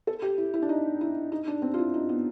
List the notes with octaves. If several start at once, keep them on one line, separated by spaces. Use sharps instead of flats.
A4
G4
E4
E4
D4
D#4
E4
D#4
D4
C4
F4
E4
D#4
B3